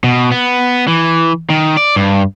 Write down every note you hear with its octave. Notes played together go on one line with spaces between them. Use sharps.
B2
B3
E3
D#3
D5
G2